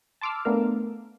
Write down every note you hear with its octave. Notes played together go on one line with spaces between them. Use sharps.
A5 C6 D6 E6 F6
A3 B3 D4 A#4 F5